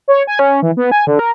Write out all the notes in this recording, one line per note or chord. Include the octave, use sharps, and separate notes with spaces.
C#5
G#5
C#4
E3
B3
G#5
D3
A#4